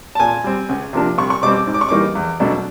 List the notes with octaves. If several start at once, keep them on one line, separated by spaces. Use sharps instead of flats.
A5
A#2 G#5
G3 C4
C#2
C3 F3 A#3 D4
C2 C#6
C#6
B2 G3 C4 D6
D6
G#2
D6
C#6
E3 G3 A#3 D#4 D6
E2
B2 F#3 A3 D4